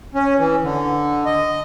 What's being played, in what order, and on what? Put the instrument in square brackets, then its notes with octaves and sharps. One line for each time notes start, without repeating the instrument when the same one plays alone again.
[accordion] C#4
E3
D3
D#5